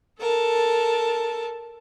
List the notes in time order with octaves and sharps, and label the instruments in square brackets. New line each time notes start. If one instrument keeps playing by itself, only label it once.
[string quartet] A4 A#4 A5